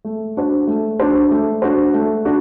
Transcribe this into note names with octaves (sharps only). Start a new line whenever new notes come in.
A3
D4 F#4 C5
A3
D4 F#4 C5
A3
D4 F#4 C5
A3
D4 F#4